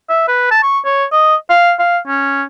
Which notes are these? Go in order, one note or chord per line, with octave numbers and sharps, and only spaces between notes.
E5
B4
A5
C#6
C#5
D#5
F5
F5
C#4